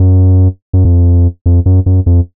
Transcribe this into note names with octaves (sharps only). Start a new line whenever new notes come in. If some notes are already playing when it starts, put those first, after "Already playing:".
Already playing: F#2
F#2
F2
F2
F#2
F#2
F2